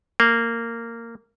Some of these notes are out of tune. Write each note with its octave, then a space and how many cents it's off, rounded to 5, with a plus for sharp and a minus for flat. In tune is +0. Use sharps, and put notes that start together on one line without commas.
A#3 -15